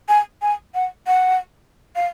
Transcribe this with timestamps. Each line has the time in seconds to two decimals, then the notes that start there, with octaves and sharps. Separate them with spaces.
0.09 G#5
0.42 G#5
0.75 F#5
1.07 F#5
1.96 F5